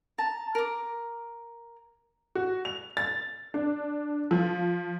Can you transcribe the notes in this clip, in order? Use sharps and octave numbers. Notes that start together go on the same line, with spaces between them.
A5 A#5
A#4 D6
F#4
F7
A6
D4
F3